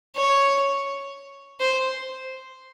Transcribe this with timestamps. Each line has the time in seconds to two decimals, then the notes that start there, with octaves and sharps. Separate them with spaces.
0.16 C#5
1.60 C5